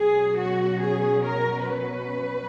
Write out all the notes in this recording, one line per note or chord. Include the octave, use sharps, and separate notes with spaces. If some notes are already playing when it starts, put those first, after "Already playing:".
Already playing: B2 F#3 C#4 G#4
F#4
G#4
A#4
B4